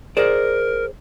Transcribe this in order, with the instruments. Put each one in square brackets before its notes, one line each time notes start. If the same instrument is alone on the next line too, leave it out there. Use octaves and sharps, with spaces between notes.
[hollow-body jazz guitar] G#4 C5 D5 [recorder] A#4